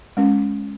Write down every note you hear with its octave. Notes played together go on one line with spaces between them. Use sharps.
G#3 C#4